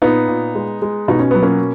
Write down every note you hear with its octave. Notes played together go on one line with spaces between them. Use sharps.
A#2 B3 D#4
A#2
G#3
G#3
B2 D#4
C#4
F#3 B3
A#3 C#4